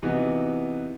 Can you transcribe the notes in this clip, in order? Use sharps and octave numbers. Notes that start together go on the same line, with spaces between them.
C3 E3 B3 D#4 F#4